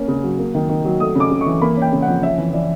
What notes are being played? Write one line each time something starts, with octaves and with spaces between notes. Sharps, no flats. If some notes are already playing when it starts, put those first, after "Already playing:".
Already playing: A#3 C#4
C#3
F#3
A#3
D#3
D#3
F#3
A3 D#6
C#3 D6
C#3
C#6
E3
A#3 B5
C#4 G5
C#3
F#5
F3
C#4 E5
E3
E3 D5